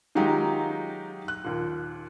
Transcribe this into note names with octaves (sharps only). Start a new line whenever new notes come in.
D#3 F#3 G#3 D#4 F4 G4
F#6
D#2 A#2